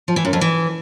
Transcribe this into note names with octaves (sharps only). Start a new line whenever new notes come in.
F3
E3
F#2
F2
E3